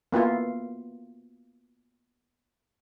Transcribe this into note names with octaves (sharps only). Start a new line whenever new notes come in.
A#3 B3 E4 F4